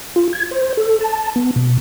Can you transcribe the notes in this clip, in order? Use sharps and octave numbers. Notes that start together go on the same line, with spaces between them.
F4
G#6
C5
A4
A5
B3
B2